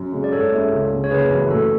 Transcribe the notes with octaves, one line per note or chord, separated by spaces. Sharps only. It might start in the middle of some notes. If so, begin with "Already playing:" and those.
Already playing: F#2
C#3 G#3
D5
G#2 A4 C#5
G#3 C#4 E4
C#2
C#3 G#3
C#5
F#1 G#4 B4
F#2 E3 G#3 C#4
A2 F#4 A4